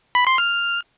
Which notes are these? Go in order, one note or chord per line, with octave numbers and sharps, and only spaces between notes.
B5
C6
F6